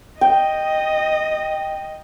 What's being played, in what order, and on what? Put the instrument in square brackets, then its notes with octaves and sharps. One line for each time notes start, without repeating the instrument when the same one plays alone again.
[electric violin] D#5 [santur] G5